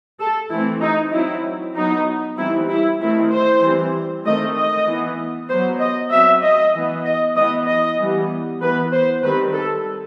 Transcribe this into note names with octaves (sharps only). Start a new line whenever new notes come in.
A4
E3 A3 C4 E4
D#4
F#3 C4 E4
F#3 B3 D#4
E3 G3 C4 E4
E4
D#3 A3 C4 E4
C5
E3 G3 C4
D#3 A3 C4 D#5
D#5
E3 B3
F#3 B3 C5
D#5
F#3 C4 E5
D#5
E3 B3
D#5
E3 B3 D#5
D#5
E3 G3 B3
E3 B3 B4
C5
D#3 G3 C4 B4
A4